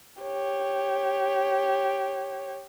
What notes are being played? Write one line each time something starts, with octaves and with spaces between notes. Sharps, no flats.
G4 C#5